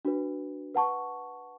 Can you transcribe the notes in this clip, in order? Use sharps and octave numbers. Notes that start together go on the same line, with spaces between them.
D4 F#4 B4
B4 F#5 A5 C#6